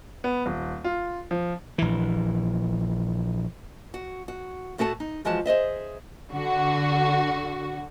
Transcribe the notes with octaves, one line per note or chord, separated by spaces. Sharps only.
B3
D#1
F4
F3
A#1 E3
F#4
F#4
A2 A3 F#4 A4 G5 A5
D#4
E3 F3 G#3 F#4 A5
G#4 C5 D#5 E5
D3 F#4